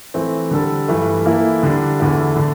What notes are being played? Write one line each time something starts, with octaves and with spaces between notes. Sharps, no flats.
E3 A3 C4
D3 G3 D4 A4
G2 E3 A3
E3 A#3 E4 A4
D3 G3 D4
E2 D3 A3 E4
D3 A3 D4